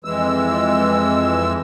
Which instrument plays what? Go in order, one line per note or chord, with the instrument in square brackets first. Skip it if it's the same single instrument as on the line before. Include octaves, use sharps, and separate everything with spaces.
[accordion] F2 E3 G#3 E6